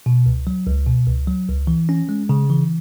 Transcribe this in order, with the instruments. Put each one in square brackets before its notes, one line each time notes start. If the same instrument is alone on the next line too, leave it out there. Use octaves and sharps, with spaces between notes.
[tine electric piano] B2
C#2
F#3
C#2
B2
C#2
F#3
C#2
E3
C#4
G#3
C#3
E3